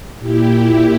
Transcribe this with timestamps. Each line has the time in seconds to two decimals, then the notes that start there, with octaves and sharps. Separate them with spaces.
0.19 A#2 E4 G4
0.49 E4 G4